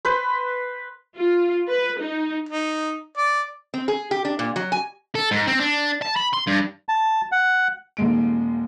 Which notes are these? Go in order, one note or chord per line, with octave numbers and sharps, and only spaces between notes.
B4 C5
F4
B4
D#4
D#4
D5
C4
G#4
G4
D4
A#2
F#3
G#5
A4
G#2
C4
D4
A5
B5
C6
G2
A5
F#5
D#1 D#2 G#3 D7